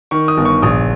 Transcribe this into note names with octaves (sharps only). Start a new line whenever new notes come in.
D#3 C#6
D#6
G1
C#6
A#1 D#6